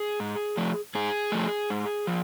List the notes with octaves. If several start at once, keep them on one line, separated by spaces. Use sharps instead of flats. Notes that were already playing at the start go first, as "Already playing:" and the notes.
Already playing: G#4
G#2
F3 A3
G#2 G#4
F3 A3
G#2
F3